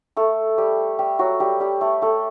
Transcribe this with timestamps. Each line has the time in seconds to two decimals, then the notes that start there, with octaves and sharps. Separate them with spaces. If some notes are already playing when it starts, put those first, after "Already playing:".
0.17 A3 A4
0.58 G3 G4
0.99 G3 G4
1.19 F#3 F#4
1.40 G3 G4
1.60 G3 G4
1.81 A3 A4
2.02 A3 A4